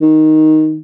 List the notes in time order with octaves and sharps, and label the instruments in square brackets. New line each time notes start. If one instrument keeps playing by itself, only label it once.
[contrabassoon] D#3